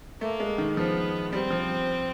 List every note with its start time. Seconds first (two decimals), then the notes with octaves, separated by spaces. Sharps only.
0.21 A3 A#3
0.40 G#3
0.58 D#3
0.76 F3 B3
1.32 G3 C4
1.50 F3